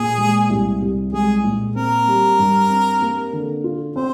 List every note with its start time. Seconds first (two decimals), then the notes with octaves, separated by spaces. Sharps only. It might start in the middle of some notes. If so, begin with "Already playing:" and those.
Already playing: A#2 G#4
0.18 G#3
0.50 C2
0.82 C2
1.13 G#3 G#4
1.44 A#2
1.75 C4 A#4
2.07 G3
2.39 G2
2.70 C4
3.01 A#3
3.33 D3
3.64 F4
3.96 C4 C5